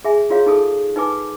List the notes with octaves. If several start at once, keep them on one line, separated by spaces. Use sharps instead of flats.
G#4 E5 G#5
F4 F#4 G#4 C#5 F5
D#4 G#4 A4 D#6
D#4 B4 G#5 D6